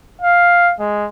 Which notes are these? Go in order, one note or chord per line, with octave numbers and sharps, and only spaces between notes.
F5
G#3